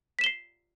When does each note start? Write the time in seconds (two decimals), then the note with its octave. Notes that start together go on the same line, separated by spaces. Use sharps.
0.19 B6
0.21 E7
0.24 G7
0.26 C7